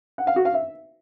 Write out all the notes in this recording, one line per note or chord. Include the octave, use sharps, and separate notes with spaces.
F#5
F5
F#4
F5
E5